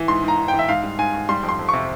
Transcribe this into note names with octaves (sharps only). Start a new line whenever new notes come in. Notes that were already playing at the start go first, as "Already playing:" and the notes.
Already playing: E3
G#2 C6
G#2 A#5
G#2
G5
E3
E5
G#2 F5
G3
G#2 G#5
G#2
G3 C6
F2
C6
F2
C3 C#6